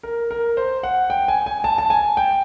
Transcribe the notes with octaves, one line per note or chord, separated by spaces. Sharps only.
A#4
A#4
C5
F#5
G5
G#5
G#5
A5
A5
G#5
G5